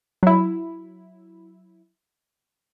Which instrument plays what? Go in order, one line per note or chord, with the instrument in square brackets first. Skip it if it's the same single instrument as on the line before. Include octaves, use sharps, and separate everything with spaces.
[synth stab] F#3 E4